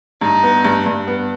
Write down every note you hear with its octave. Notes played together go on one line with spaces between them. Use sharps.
G2 D#4
B3
G2
G2
B3